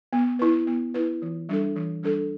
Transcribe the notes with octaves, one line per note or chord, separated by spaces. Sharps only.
B3
E4 B4
B3
E4 B4
E3
G3 D4 A4
E3
G3 D4 A4